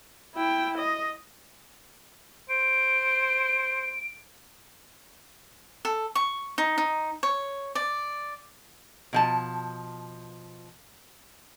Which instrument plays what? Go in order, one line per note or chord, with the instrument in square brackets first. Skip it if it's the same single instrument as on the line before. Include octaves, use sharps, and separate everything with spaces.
[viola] E4 G5
D#5
[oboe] C5 [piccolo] D7
[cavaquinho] A4
C#6
D#4
D#4
C#5
D5
[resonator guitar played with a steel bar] B2 F3 A5